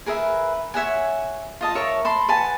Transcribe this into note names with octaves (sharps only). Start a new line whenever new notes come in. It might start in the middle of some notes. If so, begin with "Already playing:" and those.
G#4 A#4 B4 E5
C#5 E5 F#5 G#5
F4 D#5 A5
A#4 C#5 E5
A5 B5 C6
B4 F#5 G#5 A5